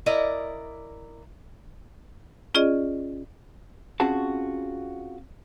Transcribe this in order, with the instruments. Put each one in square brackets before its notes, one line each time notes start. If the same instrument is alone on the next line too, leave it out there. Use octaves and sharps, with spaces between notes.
[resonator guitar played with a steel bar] E4 A#4 D5 D#5
[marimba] C#4 F4 G#4 D5 D#5
[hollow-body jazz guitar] C4 C#4 F4 F#4 G#4 A5